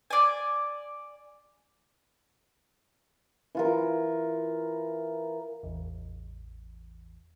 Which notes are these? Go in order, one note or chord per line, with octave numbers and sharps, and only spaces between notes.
D5 G#5
E3 F4 A#4
A1 E2